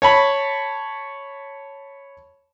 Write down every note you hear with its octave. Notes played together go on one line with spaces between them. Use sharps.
C#5 A5 B5